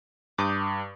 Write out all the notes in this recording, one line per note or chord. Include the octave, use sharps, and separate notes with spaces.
G2 D6 D#6 G6